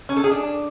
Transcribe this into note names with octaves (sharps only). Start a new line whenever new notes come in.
C#4
A4
G#4
D4